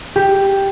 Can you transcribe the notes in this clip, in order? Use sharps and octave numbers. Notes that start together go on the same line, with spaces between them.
G4